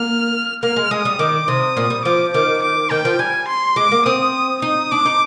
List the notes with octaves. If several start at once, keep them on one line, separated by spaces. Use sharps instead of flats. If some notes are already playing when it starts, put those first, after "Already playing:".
Already playing: A#3 F6
A#3 F6
G#3
G#3 D#6
G3
D#3 D6
C3 D#6
A#2
G3
F3 D6
D#3 D6
D6
D#3 G5
F3
G3 G#5
C6
G#3 D6
A#3
C4 D#6
D#4 D#6
D4 D6
D#4